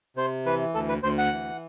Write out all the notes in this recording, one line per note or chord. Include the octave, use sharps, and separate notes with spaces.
C3 C5
E3 B4
D2 A4
B4
D2 C5
F#5
E3